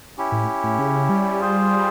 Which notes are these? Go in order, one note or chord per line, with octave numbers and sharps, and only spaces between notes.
C#4 E4 G4
A2
A2
C#3
G3
F4 G#4 C5